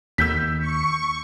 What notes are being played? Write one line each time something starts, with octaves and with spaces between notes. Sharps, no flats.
D#2 D#3 E6 G6 B6
C#6